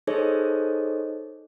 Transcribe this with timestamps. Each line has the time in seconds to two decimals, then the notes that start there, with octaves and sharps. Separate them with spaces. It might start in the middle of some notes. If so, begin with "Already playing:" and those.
0.07 D#4 G#4 A4 C5 C#5 D#5